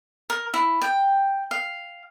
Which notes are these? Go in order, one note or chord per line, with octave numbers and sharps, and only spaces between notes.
A#4
E4
G5
F5